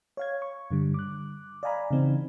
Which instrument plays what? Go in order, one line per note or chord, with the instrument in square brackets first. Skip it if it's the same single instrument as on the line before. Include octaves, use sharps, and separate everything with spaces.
[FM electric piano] C#5 F5 G#6
C#6
G2 D3 G3
D6 F#6
D5 D#5 F5 G#5 A#5 B5
C#3 E3 C4 D#4